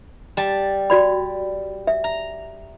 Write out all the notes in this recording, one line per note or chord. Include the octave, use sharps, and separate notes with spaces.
G3 A5
F#4 D5 B5
E5
A#5